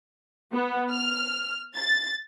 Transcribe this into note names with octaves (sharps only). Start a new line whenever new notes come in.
B3
F6
A6